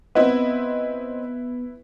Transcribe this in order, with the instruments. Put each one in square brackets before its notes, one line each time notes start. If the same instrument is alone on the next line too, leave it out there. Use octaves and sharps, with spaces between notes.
[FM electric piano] B3 [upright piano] C4 D#5 [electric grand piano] E4 B4